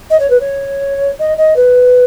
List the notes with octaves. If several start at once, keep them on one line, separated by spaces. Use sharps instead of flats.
D#5
C#5
B4
C#5
D#5
D#5
B4